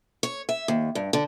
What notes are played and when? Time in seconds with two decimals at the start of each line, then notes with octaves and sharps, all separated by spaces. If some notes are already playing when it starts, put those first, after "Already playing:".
0.23 C#5
0.49 E5
0.68 D#2
0.95 G2
1.13 D3